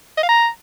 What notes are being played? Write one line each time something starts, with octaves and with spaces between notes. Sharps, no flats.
D#5
F5
A#5